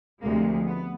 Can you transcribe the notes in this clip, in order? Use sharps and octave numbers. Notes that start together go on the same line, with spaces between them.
D2 C3 F3 G#3 A#3
B3